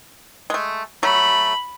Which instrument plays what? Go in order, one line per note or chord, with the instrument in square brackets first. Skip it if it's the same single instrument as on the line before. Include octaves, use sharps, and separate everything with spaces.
[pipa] G#3 A3
[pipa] F#3 A3 [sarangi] B5